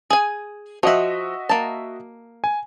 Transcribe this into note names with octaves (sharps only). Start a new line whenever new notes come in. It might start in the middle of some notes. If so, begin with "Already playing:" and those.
G#4 G#5
F3 F#4 D#5 E5 F#5
A#3 A5
G#5